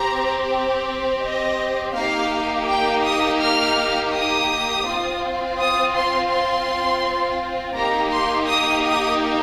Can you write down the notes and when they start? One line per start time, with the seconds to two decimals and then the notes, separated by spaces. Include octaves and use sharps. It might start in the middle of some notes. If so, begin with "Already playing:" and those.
Already playing: C4 G4 A#5
1.24 D#5
1.95 A#3 D#4 G4 F5
2.68 G5
3.04 D#6
3.40 F6
4.13 D#6
4.86 C4 F4
5.58 D#6
5.94 C6
6.30 C6
7.75 A#3 D#4 G4 A#5
8.11 C6
8.47 D#6
8.84 D#6